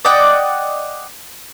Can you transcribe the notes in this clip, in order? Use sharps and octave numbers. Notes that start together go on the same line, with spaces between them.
D5 D#5 F#5 G5